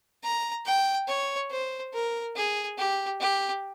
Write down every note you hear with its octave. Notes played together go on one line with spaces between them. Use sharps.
A#5
G5
C#5
C5
A#4
G#4
G4
G4